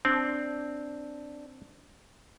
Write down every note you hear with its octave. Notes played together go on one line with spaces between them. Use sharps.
C4 D4